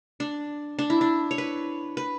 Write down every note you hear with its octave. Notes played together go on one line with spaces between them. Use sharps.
D4
D4
E4
D4
C#5
B4
B4